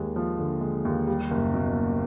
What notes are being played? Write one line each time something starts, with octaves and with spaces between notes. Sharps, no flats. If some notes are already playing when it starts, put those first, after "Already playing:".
Already playing: D#2 G#3
F3
D3
G#3
D#2
G3
F#1
B2